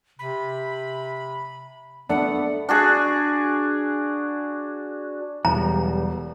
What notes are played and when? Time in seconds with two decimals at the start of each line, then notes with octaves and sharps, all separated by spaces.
0.19 C3 B5
2.09 A3 B3 D4 F#5
2.69 D4 F#4 G#4
5.45 E1 B1 G3 A#5